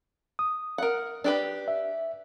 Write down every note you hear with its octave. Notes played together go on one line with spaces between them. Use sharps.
D#6
A#4 F#5
D4 G4 B4
E5